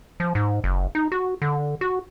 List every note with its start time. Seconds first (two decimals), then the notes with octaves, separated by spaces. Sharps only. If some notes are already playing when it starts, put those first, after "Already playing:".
0.20 F3
0.35 G#2
0.64 F#1
0.95 D#4
1.12 F#4
1.42 D3
1.81 F#4